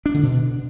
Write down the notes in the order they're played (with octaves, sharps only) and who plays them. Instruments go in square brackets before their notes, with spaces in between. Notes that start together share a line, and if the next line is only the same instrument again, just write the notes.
[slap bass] D4
D3
B2